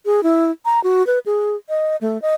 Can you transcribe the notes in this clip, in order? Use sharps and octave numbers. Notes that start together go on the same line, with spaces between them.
G#4
E4
A#5
F#4
B4
G#4
D#5
A3
D#5